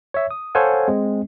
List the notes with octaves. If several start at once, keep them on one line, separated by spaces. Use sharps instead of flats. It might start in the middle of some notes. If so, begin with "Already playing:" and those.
C#5 E5
D#6
A4 C5 C#5 F5 F#5 G#5
G#3 C4